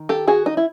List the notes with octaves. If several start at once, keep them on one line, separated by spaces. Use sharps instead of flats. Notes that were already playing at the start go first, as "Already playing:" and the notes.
Already playing: D#3
G4 A4
F#4 G#4
D#4
E4